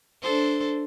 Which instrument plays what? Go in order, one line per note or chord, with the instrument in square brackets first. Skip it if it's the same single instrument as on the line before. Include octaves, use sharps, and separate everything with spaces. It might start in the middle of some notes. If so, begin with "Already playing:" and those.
[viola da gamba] D4 A4 C5